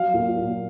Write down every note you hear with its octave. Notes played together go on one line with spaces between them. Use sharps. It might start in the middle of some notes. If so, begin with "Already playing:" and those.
Already playing: F#3 F5
A#2
A#2